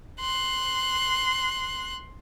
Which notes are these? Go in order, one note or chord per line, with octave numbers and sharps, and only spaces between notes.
C6 F#6